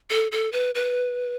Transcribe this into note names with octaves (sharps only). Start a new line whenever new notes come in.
A4
A4
B4
B4